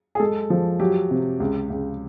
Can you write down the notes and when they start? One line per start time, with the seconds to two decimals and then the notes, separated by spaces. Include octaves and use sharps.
0.15 G#4
0.20 G#3 A4
0.50 F3
0.80 F#3 G4
1.11 C3
1.40 C#2
1.70 C#2